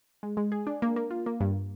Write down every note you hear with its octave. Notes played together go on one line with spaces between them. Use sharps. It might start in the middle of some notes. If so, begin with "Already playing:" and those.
G#3
G#3
G#4
D4
A#3
A#3
F4
A#3
G2